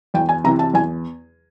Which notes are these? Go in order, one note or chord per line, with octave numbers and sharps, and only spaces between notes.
E2 G5
G#5
C3 E3 A#5
A5
E2 G#5